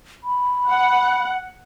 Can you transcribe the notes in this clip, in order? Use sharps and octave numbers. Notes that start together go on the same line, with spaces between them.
B5
F#5